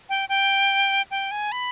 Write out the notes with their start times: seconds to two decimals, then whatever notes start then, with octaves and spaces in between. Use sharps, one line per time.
0.09 G5
0.29 G5
1.11 G5
1.31 G#5
1.52 B5